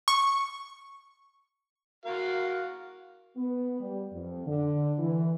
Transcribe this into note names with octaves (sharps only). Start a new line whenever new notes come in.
C#6
F#4 A#4 F5
B3
G3
F2
D3
E3